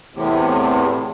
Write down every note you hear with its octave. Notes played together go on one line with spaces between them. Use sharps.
E2 A2 C3